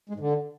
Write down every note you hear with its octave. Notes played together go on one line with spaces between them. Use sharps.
G#3
G#2
D3